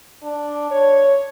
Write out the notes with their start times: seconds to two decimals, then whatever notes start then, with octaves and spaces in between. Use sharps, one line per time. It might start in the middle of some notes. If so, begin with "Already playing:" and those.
0.23 D4
0.71 C#5